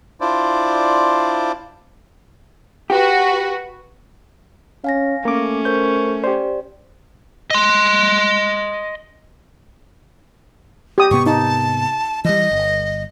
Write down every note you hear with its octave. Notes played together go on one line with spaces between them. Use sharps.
D4 E4 F4 C5 D5
F#4 G4 B4
C#4 F5 G#5 A#6
A3 A#3 C#4 D6
A#4 C5 C#6 G6
G4 C5 D5
D#5 C6
G4 D#6
G#2 C3 B3 C#6
D#4 A5
E3 G3 D#5
G1